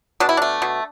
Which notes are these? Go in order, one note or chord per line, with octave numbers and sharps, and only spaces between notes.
B2 D4
E4
A3 D4
B2